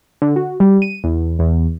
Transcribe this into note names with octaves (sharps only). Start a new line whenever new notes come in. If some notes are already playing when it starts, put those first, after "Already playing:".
D3
F#4
G3
D#7
E2
E2